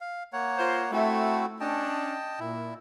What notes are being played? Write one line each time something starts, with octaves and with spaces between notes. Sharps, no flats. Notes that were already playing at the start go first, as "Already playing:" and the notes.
F5
A#3 C#5 F#5
F4 A#4 C5
A3 C4 E4 F#4
C#4 D4 D#5 G5 A5
A#2 E4